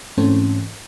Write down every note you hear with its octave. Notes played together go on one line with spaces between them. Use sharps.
G#2 E3 A3 C4 C#4